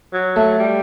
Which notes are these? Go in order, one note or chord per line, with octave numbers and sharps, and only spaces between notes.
F#3
A3
G3